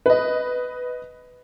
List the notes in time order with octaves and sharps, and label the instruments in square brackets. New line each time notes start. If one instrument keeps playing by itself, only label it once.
[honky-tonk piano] B4 D#5